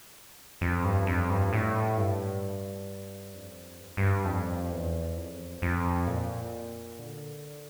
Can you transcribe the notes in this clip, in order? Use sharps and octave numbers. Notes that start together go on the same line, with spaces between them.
F2
G2
F2
G2
A2
G2
F2
G2
F2
G2
F2
E2
F2
F2
A#2
D3